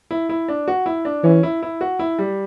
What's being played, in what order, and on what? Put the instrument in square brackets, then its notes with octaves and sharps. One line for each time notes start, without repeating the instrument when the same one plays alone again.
[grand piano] E4
E4
D4
F#4
E4
D4
[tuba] E3 [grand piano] C#4
[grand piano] E4
E4
F#4
E4
G3